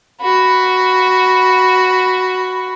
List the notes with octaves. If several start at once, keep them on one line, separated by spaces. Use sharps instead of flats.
F#4 B5